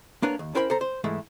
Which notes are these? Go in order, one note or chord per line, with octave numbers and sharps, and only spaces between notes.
A#3 B3 D4 A#4 B4 C#5
D#2
C#4 E4 A#4 C5 G5 B5
A4 C5 A#5
C5
G#2 E3 G#3 A3 E4